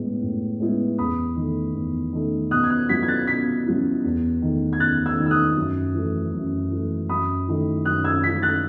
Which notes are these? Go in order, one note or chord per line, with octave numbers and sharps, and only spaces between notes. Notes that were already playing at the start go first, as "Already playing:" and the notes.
Already playing: A2 G#3 B3 E4
A2
G#3 B3 E4
E2 B5 D#6
D#3 A3
E2
D#3 A3
B2 D#6 F#6
G#6
D#6 F#6
F#3 C#4 E4 G#6 B6
G#6
F#6 A6
B2 G#6 B6
F#3 C#4 E4
E2
D#3 A3
G#6
E2 F#6 A6
E6 G#6
D#3 A3
E6
D#6 F#6
F#2
E3 A3
F#2
E3 A3
F#2 B5 D#6
D#3 A3 E4
F#2 D#6 F#6
E6 G#6
D#3 A3 E4 G#6 B6
F#6 A6